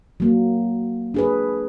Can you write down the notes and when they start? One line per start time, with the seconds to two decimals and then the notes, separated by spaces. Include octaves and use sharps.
0.20 F#3 A#3
1.14 D4 G#4 B4